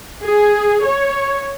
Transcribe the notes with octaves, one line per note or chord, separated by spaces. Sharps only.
G#4
C#5